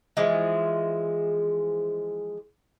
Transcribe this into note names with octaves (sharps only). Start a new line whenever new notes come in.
E3 F3 G#3